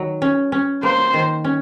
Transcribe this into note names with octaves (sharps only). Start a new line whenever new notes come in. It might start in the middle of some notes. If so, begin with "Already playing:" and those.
Already playing: D#3 F#3
C#4
C#4
A#3 C5
D#3
C#4